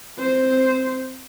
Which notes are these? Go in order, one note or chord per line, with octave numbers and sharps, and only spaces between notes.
C4 C5